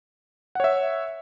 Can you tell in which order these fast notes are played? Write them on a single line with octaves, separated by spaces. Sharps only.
F#5 C#5 E5